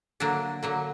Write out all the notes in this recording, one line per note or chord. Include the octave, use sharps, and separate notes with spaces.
D3 F#3 A#3 D4
D3 F#3 A#3